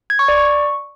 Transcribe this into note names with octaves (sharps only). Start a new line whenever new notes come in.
G#6
C#6
D5
C#6